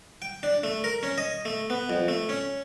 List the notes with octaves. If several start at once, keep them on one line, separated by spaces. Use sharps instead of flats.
G5
D4
A3
A#4
C#4
D#5
A3
B3
F2
A3
C#4